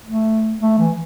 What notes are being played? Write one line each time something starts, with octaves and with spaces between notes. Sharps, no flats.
A3
A3
E3